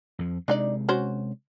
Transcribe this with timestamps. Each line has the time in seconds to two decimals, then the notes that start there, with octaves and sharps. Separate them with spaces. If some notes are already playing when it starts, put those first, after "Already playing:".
0.19 F2 F3
0.48 C3 G#3 D4 D#4 D5
0.89 C#4 F#4 C5